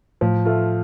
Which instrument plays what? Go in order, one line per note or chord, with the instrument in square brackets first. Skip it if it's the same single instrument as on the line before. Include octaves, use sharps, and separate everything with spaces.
[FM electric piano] A2 [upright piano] F3
[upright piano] A3 F4